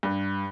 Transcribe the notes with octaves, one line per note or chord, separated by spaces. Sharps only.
G2